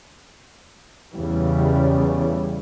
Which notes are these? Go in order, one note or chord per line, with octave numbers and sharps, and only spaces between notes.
E2 C#3 E3 G3